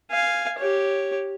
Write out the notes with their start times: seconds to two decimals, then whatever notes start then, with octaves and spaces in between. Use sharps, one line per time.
0.11 F5 G#5
0.59 G4 C#5